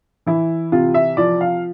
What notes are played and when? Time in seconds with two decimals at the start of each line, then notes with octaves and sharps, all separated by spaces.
0.26 E3 E4
0.72 C3 F4
0.94 E5
1.17 F3 D5
1.41 F5